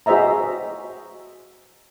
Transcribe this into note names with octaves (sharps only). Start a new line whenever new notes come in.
F#4 G#4 C5 D#5 E5 A#5